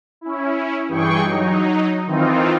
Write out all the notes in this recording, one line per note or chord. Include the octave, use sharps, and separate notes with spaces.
C#4 E4
G2 E3 G#4 G5 C#6
F#3 D#4
D#3 E3 C4 D#4 F4